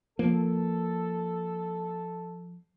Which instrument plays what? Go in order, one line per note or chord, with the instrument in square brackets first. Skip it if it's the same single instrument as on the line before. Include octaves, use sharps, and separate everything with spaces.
[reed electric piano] F3 [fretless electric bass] A#3 [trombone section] A4